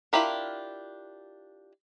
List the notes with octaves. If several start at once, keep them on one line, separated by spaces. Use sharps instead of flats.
D4 E4 F4 G4 A#4